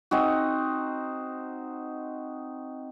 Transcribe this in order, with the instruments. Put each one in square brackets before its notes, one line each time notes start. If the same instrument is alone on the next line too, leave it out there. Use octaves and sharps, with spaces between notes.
[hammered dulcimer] C4 D#4 F#4